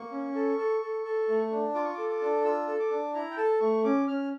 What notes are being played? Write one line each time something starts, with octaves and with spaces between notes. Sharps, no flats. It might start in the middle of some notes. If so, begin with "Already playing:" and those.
Already playing: A#3 C#6
C#4
A4
A4
A4
A4
A3
D4
F4 D6
C#6
A4 D6
D6
D4
F4 E6
A4
D6
D4
E4 A#5
G5
A4 A5
A3 C#6
C#4 D6
C#4 F6